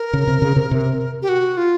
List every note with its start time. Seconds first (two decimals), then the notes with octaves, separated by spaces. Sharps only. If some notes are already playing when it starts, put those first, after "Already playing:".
Already playing: A#4
0.13 C#3
0.27 C3
0.42 C#3
0.56 C3
0.71 C3
1.22 G4
1.29 F#4
1.57 F4